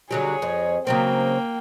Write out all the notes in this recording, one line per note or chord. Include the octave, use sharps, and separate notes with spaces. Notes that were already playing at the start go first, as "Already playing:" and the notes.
D3 F#3 G3 G#4 C#5
F2
C#3 F#3 A#3 C4 G5